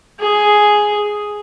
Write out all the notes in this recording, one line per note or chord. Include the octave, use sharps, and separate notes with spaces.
G#4